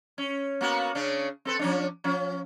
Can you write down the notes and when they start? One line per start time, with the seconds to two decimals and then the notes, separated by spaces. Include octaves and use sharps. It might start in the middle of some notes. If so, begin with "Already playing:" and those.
0.18 C#4
0.61 A#3 B3 F#4
0.95 C#3 C#4 D4
1.45 C4 A4 B4
1.59 F3 C#4 D4
2.04 F3 C#4